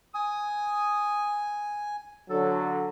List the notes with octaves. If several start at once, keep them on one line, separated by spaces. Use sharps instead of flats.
G#5 D#6
D3 F#3 A4